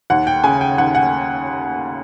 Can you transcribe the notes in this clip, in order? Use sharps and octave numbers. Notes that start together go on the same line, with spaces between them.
D#2 F#5
G5
C#3 G#5
G5
D#2 F#5
F#5